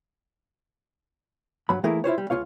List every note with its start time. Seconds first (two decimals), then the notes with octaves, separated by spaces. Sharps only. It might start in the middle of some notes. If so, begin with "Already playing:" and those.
1.69 G2 F#3 B5
1.84 E3 A3 A#3 E4 G#4 A#4
2.04 E4 F4 C5 C#5
2.18 G3
2.30 C#2 F4 C#5 F5